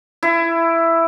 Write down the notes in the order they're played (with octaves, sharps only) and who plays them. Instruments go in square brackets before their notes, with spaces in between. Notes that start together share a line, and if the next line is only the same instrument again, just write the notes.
[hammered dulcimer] E4